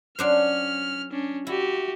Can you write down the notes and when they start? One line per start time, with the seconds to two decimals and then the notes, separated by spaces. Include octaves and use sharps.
0.19 F#3 C#4 D4 C5 F6
1.12 C#4 D4
1.47 E4 F#4 G4